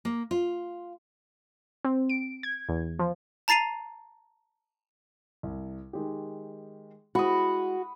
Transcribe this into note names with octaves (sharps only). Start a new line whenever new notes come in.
A#3
F4
C4
D7
G#6
E2
F3
A5 A#5 A6 C7 D#7 F7
C2
D#3 G#3 G4
G#3 E4 F#4 C5 B5 D#6